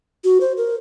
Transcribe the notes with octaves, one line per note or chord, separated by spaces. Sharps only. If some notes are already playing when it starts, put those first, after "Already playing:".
F#4
C5
A#4